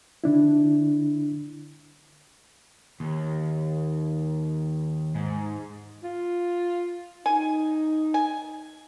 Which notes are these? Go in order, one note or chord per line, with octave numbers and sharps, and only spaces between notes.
D3 D4 E4
D#2
G#2
F4
D#4 G#5
G#5